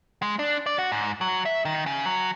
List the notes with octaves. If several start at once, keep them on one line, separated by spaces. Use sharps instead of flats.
G#3
D4
D5
F#4
G#2
F#3
E5
D#3
C#3
F#3